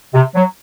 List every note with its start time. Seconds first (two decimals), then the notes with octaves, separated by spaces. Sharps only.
0.14 C3
0.35 F#3